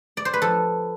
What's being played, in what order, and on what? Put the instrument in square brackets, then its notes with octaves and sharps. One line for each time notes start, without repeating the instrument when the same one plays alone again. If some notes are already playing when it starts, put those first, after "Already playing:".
[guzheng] D5
C5
B4
F3 A4